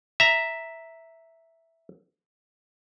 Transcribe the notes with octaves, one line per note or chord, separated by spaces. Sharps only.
E5 A#5